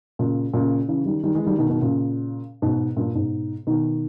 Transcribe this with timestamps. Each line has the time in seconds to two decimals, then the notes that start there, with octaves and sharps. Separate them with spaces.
0.19 A#2 C#3
0.54 A#2 C#3
0.88 C#3 E3
1.05 D#3 G3
1.23 D#3 G3
1.35 E3 G#3
1.46 D#3 G3
1.58 B2 D#3
1.70 B2 D#3
1.82 A#2 C#3
2.62 G#2 B2
2.97 G2 A#2
3.14 G#2 B2
3.67 B2 D#3